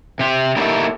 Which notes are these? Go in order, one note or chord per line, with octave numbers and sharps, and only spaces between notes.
C3 G4
A#3 D#4 E4 G4 A4